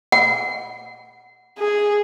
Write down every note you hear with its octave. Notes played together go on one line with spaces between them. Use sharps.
F#5
G#4